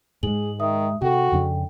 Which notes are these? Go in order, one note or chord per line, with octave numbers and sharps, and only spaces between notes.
G#2 G#3 G#4 F#7
D#3 E5 D#6
C3 F#4 A4 G5
F2 C#3 D4